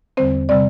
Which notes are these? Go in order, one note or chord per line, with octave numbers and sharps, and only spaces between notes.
E2 D3 G3 C4 C5
C3 G3 C4 D5